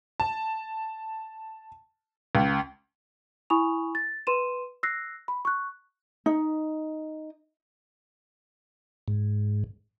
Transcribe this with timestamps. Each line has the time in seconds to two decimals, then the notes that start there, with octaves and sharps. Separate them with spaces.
0.20 A5
2.35 C#2
3.50 E4 G#5 B5 C#6 D#6 F7
3.95 A6
4.27 B4 C6 D#7 E7
4.83 E6 F#6 A#6 C7
5.28 B5
5.45 C#6 F#6
6.26 D#4
9.08 G#2